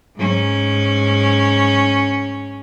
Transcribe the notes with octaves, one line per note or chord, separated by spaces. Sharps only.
G#2 C#4